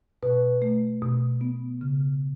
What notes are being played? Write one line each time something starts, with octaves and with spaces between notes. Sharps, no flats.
B2 B4
A3
B2
B3
C#3